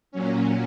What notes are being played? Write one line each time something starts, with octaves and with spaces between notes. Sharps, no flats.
A#2 F#3 C#4